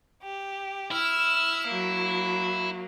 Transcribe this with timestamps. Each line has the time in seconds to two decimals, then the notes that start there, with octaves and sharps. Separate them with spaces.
0.23 G4
0.91 E4 E6 F6
1.68 F#3 A#3